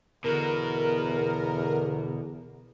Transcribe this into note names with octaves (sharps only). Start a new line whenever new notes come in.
E2 B2 D3 F#4 A#4